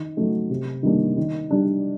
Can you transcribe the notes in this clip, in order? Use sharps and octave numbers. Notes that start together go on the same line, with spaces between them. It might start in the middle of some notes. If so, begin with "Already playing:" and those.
Already playing: D#3
F#3 A3 D#4
C3
D#3 G3 A#3 D4
D#3
G3 D4